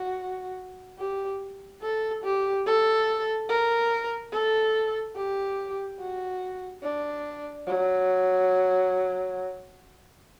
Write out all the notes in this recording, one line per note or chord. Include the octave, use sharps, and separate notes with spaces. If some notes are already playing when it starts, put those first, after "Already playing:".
Already playing: F#4
G4
A4
G4
A4
A#4
A4
G4
F#4
D4
F#3